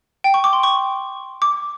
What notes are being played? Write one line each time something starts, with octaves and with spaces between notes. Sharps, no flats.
G5
C#6
D6
C6
C#6
D6